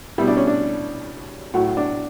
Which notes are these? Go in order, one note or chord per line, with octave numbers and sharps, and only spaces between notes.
B2 G3 E4
D4
C#4
D4
A2 F#3 F#4
D4